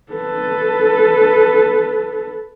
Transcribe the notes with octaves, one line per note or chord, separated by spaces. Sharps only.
A4 B4